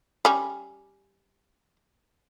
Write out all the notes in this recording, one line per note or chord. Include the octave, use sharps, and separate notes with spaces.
G3 C#4